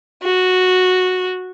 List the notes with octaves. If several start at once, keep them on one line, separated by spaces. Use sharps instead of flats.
F#4